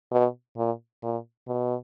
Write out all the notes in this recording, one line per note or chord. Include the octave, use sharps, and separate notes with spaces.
B2
A#2
A#2
B2